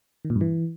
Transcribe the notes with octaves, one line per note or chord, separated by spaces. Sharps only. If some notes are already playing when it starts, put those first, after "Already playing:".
D#3
A#2
G2
E3